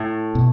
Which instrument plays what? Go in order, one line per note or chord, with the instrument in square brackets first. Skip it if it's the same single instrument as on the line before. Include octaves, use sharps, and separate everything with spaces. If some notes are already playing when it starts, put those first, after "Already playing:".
Already playing: [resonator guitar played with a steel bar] A2
[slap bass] B2